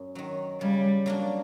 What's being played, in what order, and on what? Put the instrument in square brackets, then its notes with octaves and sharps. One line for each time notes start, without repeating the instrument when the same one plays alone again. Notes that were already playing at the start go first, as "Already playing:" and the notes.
Already playing: [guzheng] F#2
D#3 F#3
[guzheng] C#3 [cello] G3
[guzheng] F#3 A#3 D4